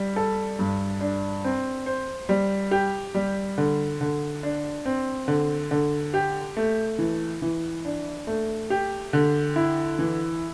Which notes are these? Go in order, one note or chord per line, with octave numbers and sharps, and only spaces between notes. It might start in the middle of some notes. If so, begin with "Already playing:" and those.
Already playing: G3
A4
G2
D4
C4
C5
G3
G4
G3
D3
D3
D4
C4
D3
D3
G4
A3
E3
E3
D4
A3
G4
D3
E4
E3